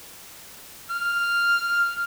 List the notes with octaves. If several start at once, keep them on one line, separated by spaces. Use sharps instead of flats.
F6